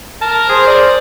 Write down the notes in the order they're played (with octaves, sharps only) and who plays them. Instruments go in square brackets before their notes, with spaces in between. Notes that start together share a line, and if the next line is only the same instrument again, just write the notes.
[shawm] A#4 [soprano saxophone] A5
[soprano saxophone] G#4 [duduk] C5
[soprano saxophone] D5